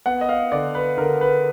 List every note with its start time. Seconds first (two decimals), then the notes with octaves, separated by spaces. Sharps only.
0.06 B3 F#5
0.21 D#5
0.29 F5
0.52 D3 D5
0.75 B4
0.97 D3 A#4
1.21 B4